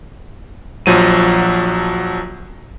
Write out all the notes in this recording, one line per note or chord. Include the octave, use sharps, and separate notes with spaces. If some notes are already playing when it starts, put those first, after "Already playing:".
A#1 F3 F#3 D#7